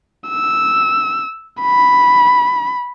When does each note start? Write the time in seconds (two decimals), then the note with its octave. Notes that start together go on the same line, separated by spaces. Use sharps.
0.29 E6
1.62 B5